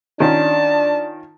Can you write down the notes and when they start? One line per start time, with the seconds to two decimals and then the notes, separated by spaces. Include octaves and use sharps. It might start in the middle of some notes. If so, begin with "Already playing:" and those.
0.20 D#3 C#4 D4 F4 A5